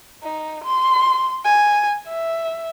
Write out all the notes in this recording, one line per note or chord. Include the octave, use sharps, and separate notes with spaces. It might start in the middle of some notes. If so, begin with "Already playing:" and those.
D#4
C6
G#5
E5